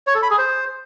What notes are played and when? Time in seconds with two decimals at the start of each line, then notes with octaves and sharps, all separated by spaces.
0.07 C#5
0.15 A4
0.23 B5
0.30 G#4
0.38 C5